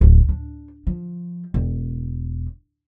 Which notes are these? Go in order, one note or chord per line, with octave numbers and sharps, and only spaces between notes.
D1
D4
F3
E1